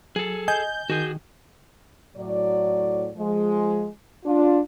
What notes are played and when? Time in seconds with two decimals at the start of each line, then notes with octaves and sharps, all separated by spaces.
0.16 F#3 G#4 A4
0.48 D#5 G#5 G6
0.90 D#3 F#4 G#4
2.17 A2 F#3 D5
3.16 F3 G#3
4.25 D4 F4